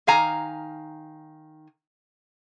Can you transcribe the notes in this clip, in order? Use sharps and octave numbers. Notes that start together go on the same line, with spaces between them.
D#3 F5 G#5 A#5